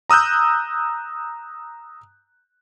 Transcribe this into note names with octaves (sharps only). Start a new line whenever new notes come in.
A#5 D#6 E6 F#6 G6